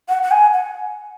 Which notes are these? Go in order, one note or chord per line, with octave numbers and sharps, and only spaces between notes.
F#5
F#5
G#5
F#5